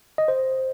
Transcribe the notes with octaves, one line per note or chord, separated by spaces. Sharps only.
D#5
C5